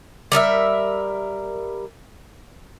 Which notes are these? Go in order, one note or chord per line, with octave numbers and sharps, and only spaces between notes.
G3 A#4 D5 E5